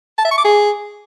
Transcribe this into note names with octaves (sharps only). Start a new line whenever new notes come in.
A5
E5
C#6
D6
G#4